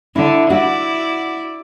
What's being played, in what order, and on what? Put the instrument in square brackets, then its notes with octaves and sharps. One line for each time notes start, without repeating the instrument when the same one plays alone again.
[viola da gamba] D3 [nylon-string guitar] E4
[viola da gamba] E4 D5 [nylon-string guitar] F#4